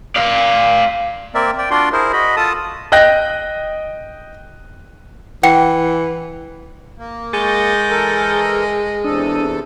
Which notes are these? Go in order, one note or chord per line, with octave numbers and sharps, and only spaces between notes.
D5 F5
A#3 C4 A#4 D5 E5
D5 G5
D4 F4 F#4 D5 C6
E4 G#4 A#4 C5
F#4 D#5 B5
F4 A4 A5 D#6
D#5 G5 F#6 A#6
E3 F#5 G5 C#7
A#3
G#3 C#6 G6 A6
E3 A4 A#4
E2 C3 D4 A4 D#6